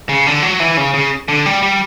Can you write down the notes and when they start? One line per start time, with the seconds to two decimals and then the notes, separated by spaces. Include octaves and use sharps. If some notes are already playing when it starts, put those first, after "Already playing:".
0.09 C#3
0.27 D3
0.43 F#3
0.60 E3
0.77 C#3
0.94 C#3
1.28 D3
1.46 G3
1.62 G3